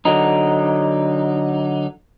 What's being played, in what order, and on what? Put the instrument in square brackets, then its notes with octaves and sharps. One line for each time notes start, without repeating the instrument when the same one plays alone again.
[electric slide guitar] D3 F#3 D#4